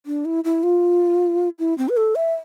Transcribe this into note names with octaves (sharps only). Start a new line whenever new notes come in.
D4
E4
E4
F4
E4
C4
B4
A4
E5